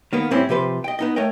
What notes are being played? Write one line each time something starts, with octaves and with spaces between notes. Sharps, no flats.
D#3 A#3 B3
A2 G3 C4 C#4 E4
C3 F3 G4 B4 C5
D#5 G5
B3 D#4 D#5
A3 A#4 C#5 D#5 G5